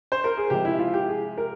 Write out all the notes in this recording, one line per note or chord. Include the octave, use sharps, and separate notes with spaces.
C5
A#4
G#4
C3 F3 G#3 G4
E4
F4
G4
G#4
A#4